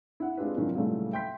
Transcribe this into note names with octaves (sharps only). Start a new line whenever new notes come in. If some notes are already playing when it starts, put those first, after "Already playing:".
E4 F#5
G#3 C4 D4 F4 G4 B4
F#2 C3 D#3 E3 D4 F4
A#2 C#3 E3 F#3 G3 A3
E5 G5 B5 C6 G6 B6